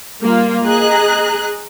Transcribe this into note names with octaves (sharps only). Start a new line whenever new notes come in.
G3 A#3 F4
G#4 D#5 A#5 F#6